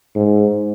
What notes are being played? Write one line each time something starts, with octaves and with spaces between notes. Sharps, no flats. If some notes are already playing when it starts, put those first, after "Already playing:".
G#2